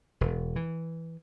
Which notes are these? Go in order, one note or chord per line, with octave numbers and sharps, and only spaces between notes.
E1
E3